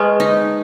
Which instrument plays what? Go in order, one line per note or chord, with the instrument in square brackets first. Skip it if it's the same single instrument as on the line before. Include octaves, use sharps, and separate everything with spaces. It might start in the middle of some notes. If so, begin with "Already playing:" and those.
Already playing: [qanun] G#3 [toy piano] B4 D#5 A5 C#6
[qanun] D#4